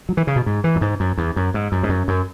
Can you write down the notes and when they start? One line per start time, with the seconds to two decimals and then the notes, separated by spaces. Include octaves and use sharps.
0.09 F#3
0.17 E3
0.27 C#3
0.36 B2
0.46 G#2
0.64 E3
0.76 F#2
0.81 G#2
1.00 F#2
1.18 E2
1.36 F#2
1.54 G#2
1.72 F#2
1.83 G#2
1.89 F#2
2.08 F#2